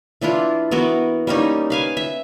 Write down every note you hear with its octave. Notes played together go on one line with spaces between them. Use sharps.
E3 D4 E4 F4
E3 B3 F#4 A#4
G3 A#3 C#4 D#4
B4 F5 G#5
E5